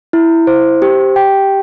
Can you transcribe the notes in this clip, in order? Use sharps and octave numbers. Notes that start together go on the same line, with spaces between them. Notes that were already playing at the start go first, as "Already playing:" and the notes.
E4
C5
G4
G5